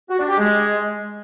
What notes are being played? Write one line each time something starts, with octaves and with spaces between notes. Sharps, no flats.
F#4
D4
G4
G#3